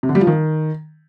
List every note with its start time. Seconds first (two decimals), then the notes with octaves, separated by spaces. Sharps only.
0.03 C3
0.09 D3
0.15 G3
0.21 F3
0.27 D#3